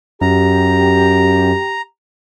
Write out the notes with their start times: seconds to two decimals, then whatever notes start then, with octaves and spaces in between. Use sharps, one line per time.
0.21 F#2 G4 A#5